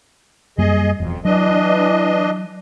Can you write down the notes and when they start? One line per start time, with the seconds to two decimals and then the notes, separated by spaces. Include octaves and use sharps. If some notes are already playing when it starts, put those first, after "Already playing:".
0.58 F#2 G3 A#3 G#4 D#5
1.00 E1 F2
1.25 E3 F#3 D4 D#5